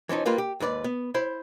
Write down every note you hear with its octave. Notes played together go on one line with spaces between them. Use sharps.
E3 F3 C#4 D#4
G3 A#3 F4 B4
G4
D#2 G#2 B4 D5
B3
E4 C5 B5